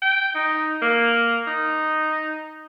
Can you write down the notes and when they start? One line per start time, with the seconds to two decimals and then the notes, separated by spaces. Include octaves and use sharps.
0.02 G5
0.35 D#4
0.82 A#3
1.47 D#4